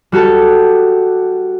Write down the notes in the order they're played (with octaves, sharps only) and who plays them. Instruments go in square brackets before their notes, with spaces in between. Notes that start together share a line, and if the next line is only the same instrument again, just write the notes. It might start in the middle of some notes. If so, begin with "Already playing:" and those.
[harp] G3 F#4 G4 A4